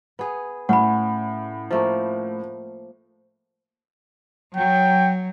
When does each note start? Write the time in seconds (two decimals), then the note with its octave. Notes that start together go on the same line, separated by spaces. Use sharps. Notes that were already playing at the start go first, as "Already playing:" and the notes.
0.19 B3 G#4
0.69 A2 C#4 F#5 B5
1.71 F3 A3 A#3
4.57 F#3 G5